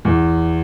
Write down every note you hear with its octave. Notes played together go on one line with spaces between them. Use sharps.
E2